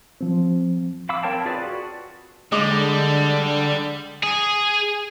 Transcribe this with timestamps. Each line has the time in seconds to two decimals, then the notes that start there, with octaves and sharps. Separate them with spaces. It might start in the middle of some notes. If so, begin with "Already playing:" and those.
0.21 F3 C4
1.09 F5 B5 D6 E6
1.23 C4 A#4 C#5 G5 A5
1.46 F4 G#4 B4 D5
1.63 F#4
2.52 D3 G3 G#3 D#5 D6
4.23 G#4